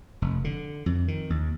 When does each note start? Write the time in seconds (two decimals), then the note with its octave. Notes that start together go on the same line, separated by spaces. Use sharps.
0.22 F1
0.44 D3
0.86 F2
1.08 D#3
1.30 D#2